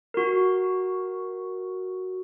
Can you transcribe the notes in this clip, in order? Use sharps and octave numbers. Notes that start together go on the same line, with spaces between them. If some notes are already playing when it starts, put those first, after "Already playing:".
F#4 A#4